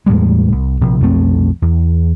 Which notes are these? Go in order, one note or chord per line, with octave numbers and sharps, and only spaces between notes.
E2 A2 G3 G#3
C2
A#1 C3
B1 F2 A3 C4
E2